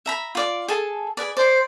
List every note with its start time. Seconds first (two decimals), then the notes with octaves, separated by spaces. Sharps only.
0.06 E5 A#5 B5
0.35 F4 D5 D6
0.68 G#4 A4 A5
1.17 G#4 B4 D5
1.37 C5 D5